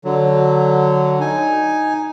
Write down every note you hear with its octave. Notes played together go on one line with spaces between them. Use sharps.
D3 F#3
D#4 G#5